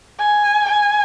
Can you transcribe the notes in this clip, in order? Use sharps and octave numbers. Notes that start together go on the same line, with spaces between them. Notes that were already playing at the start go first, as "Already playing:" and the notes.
G#5
G#5